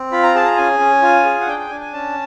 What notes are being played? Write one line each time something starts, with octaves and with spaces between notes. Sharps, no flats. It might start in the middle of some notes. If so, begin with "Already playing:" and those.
Already playing: C4
F4 B5
A#5
G#4 A5
A#5
C#4 G#5
C#4
F4
G#4
F#5
D4 G5
G5
D4 G#5
G#5
C#4 A5